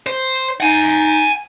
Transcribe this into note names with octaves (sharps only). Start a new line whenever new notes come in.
C5
D#4 F#5 G#5